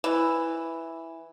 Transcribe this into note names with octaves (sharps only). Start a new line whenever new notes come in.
E3